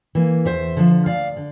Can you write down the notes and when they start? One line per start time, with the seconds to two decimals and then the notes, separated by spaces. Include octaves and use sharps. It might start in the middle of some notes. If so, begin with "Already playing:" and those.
0.15 E3 A#3
0.45 E2 C5 E5
0.77 D3 F3
1.06 D2 D5 F5
1.36 D3